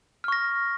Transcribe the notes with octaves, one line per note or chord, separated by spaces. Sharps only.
C#6 F6 A#6